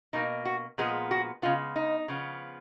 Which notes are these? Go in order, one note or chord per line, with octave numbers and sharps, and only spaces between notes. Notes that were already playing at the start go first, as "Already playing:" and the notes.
B2 A#3 D#4
F#4
A#2 F3 G#3 B3 G#4
F#4
C#3 G#3 B3 F4
D#4
C#3 F3 B3